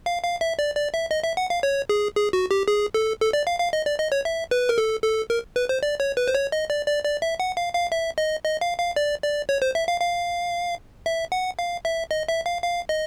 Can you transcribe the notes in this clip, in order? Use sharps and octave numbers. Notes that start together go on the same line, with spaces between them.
F5
F5
E5
D5
D5
E5
D#5
E5
F#5
F5
C#5
G#4
G#4
F#4
G4
G#4
A4
A4
D5
F5
F5
D#5
D5
D#5
C#5
E5
B4
A#4
A4
A4
A#4
B4
C5
D5
C#5
B4
C5
C#5
D#5
D5
D5
D5
E5
F#5
F5
F5
E5
D#5
D#5
F5
F5
D5
D5
C#5
C5
E5
F5
F5
E5
F#5
F5
E5
D#5
E5
F5
F5
D#5